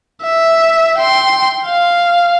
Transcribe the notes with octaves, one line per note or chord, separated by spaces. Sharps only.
E5
G5 C6
F5